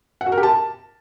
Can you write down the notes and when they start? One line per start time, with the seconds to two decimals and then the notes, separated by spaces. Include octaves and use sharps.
0.21 F#5
0.26 F#4
0.32 A#4
0.38 G4
0.43 A5